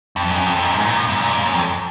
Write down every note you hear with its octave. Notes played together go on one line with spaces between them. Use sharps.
F2
F#2
F2
F#2
G#2
A#2
F#2
F#2
A#2
G#2
F#2
F2